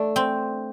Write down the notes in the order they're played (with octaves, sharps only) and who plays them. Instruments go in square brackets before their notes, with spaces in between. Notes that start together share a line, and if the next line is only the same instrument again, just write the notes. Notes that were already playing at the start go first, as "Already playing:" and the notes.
Already playing: [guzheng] A3 [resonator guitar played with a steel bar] D4
[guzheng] C4